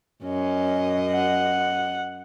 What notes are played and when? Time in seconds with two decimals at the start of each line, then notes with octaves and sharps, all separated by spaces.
0.24 F#2 C#4 D#5
1.12 F#5